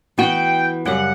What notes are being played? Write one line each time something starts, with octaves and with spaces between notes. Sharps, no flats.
E3 B3 F#4 G5
F#2 C#3 G3 F#5